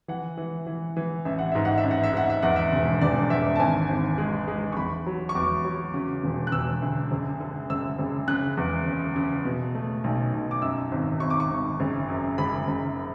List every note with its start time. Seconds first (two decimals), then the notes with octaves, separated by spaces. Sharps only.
0.08 E3 F#5
0.37 E3
0.67 E3
0.97 E3
1.25 A1 E5
1.39 F#5
1.52 G#2 E5
1.65 F#5
1.78 E5
1.84 A1
1.91 F#5
2.03 E5
2.13 G#2 F#5
2.30 E5
2.42 E2 F#5
2.56 E5
2.72 E1
3.01 E1 D5
3.30 E2 E5
3.56 A5
3.60 G#1 G#5
3.89 G#1
4.18 G#3
4.48 G#3
4.72 C#6
4.77 E2 B5
5.06 F#3
5.29 C#6
5.35 E2 D6
5.65 F#3
5.94 C#3
6.24 E1
6.47 F#6
6.52 E1 E6
6.82 D2
7.11 F#1
7.40 D3
7.69 F#1 E6
7.98 F#1
8.28 C#3 F#6
8.57 E2
8.87 F#1
9.16 C#3
9.45 B2
9.75 A3
10.04 B1
10.33 B1
10.51 D6
10.62 F#2 E6
10.92 G#1
11.20 G#1 C#6
11.30 D6
11.40 C#6
11.50 G#1
11.80 F#1
12.09 F#2
12.38 F#1 B5
12.67 F#1